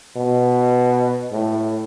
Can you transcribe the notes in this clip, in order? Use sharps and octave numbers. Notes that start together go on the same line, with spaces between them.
B2
A2